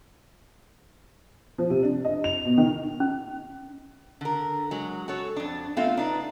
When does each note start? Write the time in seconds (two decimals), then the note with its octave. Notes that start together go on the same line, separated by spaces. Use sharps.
1.58 F3
1.70 C3
1.83 D4
2.05 D#5
2.24 F7
2.45 B2
2.58 D#3
3.00 C#4
4.21 D3 A#4
4.71 F#3 G#3
5.08 F#4 A4 C#5
5.36 F2 D4
5.77 A3 B3 C4 F4 E5 F5
5.97 D4 D#4 B4